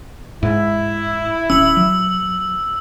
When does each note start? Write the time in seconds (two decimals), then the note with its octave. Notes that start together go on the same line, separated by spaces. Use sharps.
0.43 G#2 E4
1.50 D1 C#4 E6 F#7
1.77 F#3